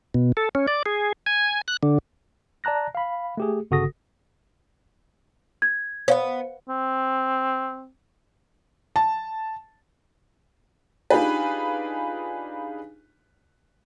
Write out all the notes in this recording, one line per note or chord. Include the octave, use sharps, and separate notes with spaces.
B2
A4
C#4
D5
G#4
G#5
F#6
D3
D5 A5 A#5 F#6 A#6
F5 B5
A3 G4 G#4
G1 C#3 F#4 A4 D#6 A#6
G#6
B3 C#4 C5 F5
C4
A5
D4 D#4 F4 G4 G#4 B4